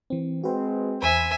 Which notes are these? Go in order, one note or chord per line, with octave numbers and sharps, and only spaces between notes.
E3 C4
G#3 C4 F#4 B4
E2 C5 E5 G#5 B5